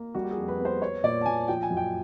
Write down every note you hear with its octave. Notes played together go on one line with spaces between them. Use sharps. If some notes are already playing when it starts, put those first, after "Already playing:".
Already playing: A#3
G3 F#4
G4
G#4
F2
B4
B3
C5
B3 C#5
A#2 D5
A5
A#2 G#5
F3 G5
G#5
F#2
G5